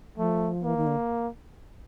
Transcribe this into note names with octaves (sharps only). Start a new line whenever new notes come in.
F3 A3
E3 A#3
D#3
D3